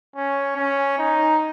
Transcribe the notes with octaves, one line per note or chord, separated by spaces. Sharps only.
C#4
C#4
D#4